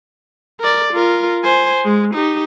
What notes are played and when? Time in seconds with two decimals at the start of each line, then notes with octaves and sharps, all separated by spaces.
0.60 A#4 D5
0.93 F4 A#4
1.44 C5 G#5
1.85 G#3
2.14 D#4 G4